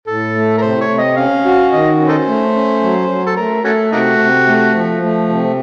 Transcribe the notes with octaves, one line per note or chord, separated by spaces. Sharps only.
A2 A4
A3
A#4
C3 C5
C#5
C3
D#5
C#4 F5
F#4
D#3 D#5
C#4
D#4 A4 C5
A3
C#4
F#3
F#3
A4
A3 A#4
A3 C#4 F#4 A4
C3 A#3 D#4 F#4
C3
A3
F3
A3
C3